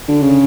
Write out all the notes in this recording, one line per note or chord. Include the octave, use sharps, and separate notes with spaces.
D3
C#3